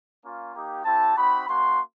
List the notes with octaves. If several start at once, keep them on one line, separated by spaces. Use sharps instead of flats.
A#3 C#4 F4
A#3 D#4 G4
C4 E4 G4 A5
C4 D#4 F#4 B5
A#3 C#4 F#4 C6